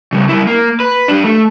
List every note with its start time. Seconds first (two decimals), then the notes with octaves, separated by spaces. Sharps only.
0.13 C#3 G3
0.29 G3 E4
0.47 A#3
0.80 B4
1.08 D4 G4
1.24 A3